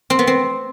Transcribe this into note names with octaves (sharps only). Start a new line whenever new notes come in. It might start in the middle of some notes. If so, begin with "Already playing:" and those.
C4
B3
C4